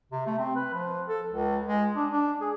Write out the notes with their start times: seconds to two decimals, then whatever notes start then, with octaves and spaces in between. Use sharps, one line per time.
0.12 C3
0.26 A3
0.39 C4
0.56 B4
0.73 F3
1.08 A4
1.29 C#2
1.66 G#3
1.95 D4
2.12 D4
2.41 G#4